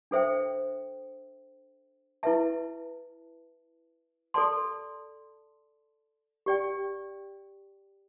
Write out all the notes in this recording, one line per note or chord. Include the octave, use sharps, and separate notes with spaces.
D4 A4 C5 E5 G5
E4 B4 E5 A5
A4 D5 A5 C6
G4 D5 G5